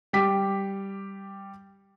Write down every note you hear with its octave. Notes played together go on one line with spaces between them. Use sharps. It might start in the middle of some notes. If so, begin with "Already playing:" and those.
G3 G4 B6